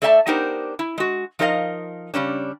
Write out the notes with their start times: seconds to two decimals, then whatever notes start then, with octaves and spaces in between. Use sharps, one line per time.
0.02 A3 A4 D5 E5 G5 A5
0.26 B3 D4 D#4 G4 A#4 C5
0.79 E4
0.98 G#3 F#4
1.39 F3 D#4 A#4 B4 D#5 F5
2.14 C#3 G3 C#4 D4